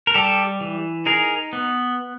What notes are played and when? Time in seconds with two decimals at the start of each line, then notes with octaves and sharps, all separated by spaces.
0.07 A#4
0.14 G3 G4 A4
0.61 E3
1.06 D#4 G#4 A#4
1.53 B3